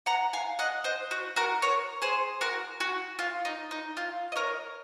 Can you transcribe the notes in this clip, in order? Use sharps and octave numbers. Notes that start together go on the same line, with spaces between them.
F#5 A#5
F5 G#5
D#5 F#5
C5 D#5
F#4
F#4 A#4
A#4 C#5
G#4 C5
F#4 A#4
F#4
F4
D#4
D#4
F4
D#5
A#4 C#5